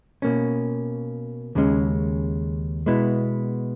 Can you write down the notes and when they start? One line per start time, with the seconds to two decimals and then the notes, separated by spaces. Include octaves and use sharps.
0.22 B2 A#3 C#4
1.55 D#2 C#3 G#3 C#4
2.86 B2 G#3 B3 E4